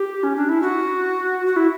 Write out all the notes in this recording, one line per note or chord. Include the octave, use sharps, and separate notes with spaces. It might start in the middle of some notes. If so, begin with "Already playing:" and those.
Already playing: G4
C#4
D4
E4
F#4
F#4
E4